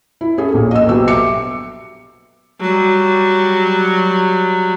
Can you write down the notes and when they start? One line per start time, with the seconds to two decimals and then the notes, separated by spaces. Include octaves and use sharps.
0.21 E4
0.37 C#4 G#4 A4
0.54 A#1 A#2
0.71 D#5 E6
0.87 A#1 B2 F#3 G4 E6
1.08 E5 D6 C#7
2.60 F#3 G3